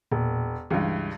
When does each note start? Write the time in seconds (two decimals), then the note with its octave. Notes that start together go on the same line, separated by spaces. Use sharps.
0.12 E1 A#2
0.70 C#2 G2 E3